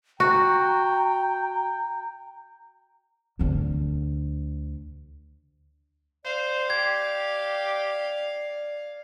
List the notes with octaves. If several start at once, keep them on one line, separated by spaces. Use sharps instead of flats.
F#4 G5 A#5
D2 D3
C5 D5 F5
G4 G#6